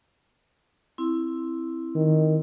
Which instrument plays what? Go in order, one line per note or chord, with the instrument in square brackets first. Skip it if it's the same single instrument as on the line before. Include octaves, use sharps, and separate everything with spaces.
[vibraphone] C4 E4
[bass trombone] D#3